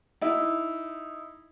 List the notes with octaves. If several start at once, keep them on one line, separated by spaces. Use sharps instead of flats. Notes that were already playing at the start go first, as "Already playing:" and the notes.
D#4 E4